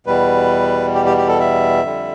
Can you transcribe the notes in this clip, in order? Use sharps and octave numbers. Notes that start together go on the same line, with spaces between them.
E2 B2 G3 B4
G4
G4
G4
A4
E5
F2 D3 G3